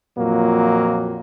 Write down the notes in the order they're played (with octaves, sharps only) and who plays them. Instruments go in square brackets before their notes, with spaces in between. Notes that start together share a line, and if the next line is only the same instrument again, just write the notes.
[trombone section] F2 A#2 F#3 A#3